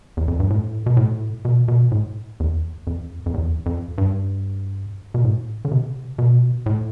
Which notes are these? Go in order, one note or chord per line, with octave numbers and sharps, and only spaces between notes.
E2
F2
G2
A2
B2
A2
B2
B2
A2
E2
F2
F2
E2
F2
G2
B2
A2
D3
C3
B2
A2